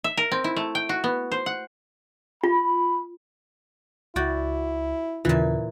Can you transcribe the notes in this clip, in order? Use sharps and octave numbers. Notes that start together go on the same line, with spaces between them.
E5
A#4
C4
E4
A3
G5
F#4
B3
C5
F#5
F4 B5
C#2 E4 F#4 D5 G5
D#2 A#2 C#3 E3 F4